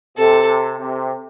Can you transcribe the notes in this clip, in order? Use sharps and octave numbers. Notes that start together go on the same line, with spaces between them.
C3 A4
C3